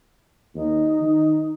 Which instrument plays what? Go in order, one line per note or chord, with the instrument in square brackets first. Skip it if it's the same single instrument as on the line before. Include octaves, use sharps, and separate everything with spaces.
[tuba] D#2 [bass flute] D#4
[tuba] D#3